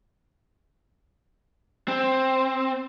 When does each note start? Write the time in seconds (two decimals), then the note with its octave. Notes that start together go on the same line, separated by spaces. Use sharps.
1.88 C4